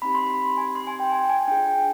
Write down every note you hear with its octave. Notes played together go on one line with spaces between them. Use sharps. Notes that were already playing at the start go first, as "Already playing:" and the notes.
C4 D#4 G4 B5
C6
B5
G#5
C6
G#5
G5
G#5
G#5
D4 F4 G#4 G5